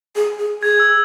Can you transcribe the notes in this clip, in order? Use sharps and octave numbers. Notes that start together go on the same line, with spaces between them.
G#4
G#4
G#4 G#6
E6